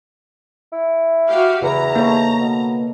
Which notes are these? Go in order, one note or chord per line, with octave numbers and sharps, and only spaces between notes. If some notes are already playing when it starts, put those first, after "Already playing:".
E4
F#4 G4 F5
E2 C#3 B4 E5 A#5
A#3 D#4 A4 C#5
B2